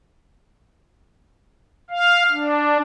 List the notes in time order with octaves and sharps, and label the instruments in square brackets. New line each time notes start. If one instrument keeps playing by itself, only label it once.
[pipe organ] F5
D4